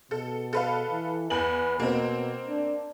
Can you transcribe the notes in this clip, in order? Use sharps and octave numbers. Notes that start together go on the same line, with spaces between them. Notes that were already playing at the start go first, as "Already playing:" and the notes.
B2 A4
A4 B4 F5
E3
E2 B4 G#5 F#7
B2 A#3 C4
D4